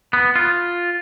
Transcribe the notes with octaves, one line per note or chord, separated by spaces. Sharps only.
B3
F4